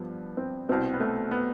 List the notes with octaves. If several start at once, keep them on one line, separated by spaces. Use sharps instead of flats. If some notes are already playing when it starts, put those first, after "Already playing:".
Already playing: G2 F3 B3
C4
C2 B2 C4
B3
A3
B3